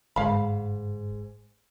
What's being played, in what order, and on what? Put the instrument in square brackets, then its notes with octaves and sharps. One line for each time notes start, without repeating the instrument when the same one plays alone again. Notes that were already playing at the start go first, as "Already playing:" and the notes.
[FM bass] G1 [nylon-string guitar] G#2 [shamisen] F5 B5